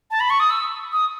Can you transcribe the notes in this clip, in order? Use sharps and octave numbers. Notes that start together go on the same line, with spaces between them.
A5
B5
C#6
D#6
E6
D#6